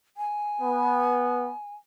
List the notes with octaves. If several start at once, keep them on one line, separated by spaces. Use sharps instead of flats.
G#5
B3